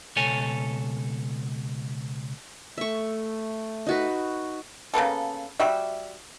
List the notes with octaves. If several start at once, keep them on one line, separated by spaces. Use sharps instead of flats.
C#2 B2 A4 C#5 G#5
A3 E5 C#6
D#4 F#4 B4
C#3 A#3 B3 A4
G3 F#4 E5